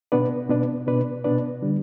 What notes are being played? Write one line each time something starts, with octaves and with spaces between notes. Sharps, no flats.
B2 B3 D4 B4 D5
B2 B3 D4 B4 D5
B2 B3 D4 B4 D5
B2 B3 D4 B4 D5
D3 G3 D4